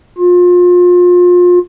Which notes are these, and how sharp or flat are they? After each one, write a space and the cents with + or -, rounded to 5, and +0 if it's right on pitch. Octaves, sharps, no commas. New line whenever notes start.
F4 +30